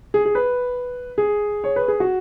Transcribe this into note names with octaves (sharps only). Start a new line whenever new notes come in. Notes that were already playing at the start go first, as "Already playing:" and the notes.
G#4
G#4
B4
G#4
C#5
B4
G#4
F#4